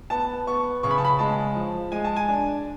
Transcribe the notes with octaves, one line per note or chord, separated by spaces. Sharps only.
B3 A5
B3 C#6
C#3 C#6
B5
A5
B5
G#3 A5
F3
G#3 G#5
A5
G#5
D4